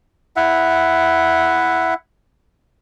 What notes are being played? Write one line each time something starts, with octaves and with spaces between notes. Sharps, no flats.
E4 E5 F#5